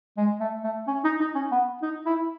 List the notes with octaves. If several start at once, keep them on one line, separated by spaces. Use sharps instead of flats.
G#3
A3
A3
C#4
D#4
D#4
C#4
B3
D#4
E4